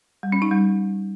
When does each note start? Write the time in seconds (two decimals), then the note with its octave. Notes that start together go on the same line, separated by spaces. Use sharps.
0.23 G3
0.32 C#4
0.42 D#4
0.51 G3